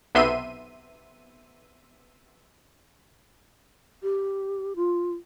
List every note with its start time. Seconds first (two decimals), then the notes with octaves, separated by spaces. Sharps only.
0.15 B1 C3 B3 E5 C6 D#7
4.03 G4
4.76 F4